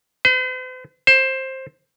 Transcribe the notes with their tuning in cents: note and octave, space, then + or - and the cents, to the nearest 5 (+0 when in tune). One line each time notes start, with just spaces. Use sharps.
C5 -45
C5 +15